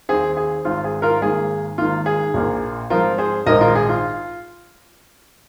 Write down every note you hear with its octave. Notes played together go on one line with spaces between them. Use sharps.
D#2 D#3 C4 G#4
G#4
G#1 G#2 D#3 C4 F4
G#4
F4 A#4
G#1 G#2 D#3 A#3 G#4
G#1 G#2 D#3 A#3 F4
G#4
A#1 A#2 A#3
G#2 F3 C4 F4 A#4
G#4 C5
A#1 G#2 D#3 G#3 C4 A#4 D#5
F4 A#4
G#4
F4